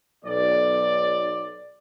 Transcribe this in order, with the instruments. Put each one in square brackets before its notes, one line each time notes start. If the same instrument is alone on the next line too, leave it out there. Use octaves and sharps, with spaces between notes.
[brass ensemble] B1 D5